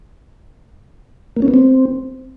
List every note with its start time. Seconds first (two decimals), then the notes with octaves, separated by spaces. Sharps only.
1.37 A#3
1.42 C#4
1.48 B3
1.54 C4